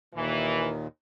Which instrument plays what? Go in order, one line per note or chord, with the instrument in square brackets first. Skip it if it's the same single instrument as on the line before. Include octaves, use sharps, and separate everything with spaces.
[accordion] D#2 A#2 D#3 [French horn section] E3